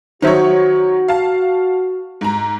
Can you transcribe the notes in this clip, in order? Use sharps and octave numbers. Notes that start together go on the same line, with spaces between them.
D#3 F#3 D#4 F#4 C5 C#5 E5
F5 A5
G#2 A#5